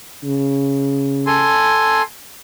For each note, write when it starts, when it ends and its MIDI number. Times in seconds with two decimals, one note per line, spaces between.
0.24 1.57 49
1.27 2.02 69
1.27 2.02 80
1.27 2.02 84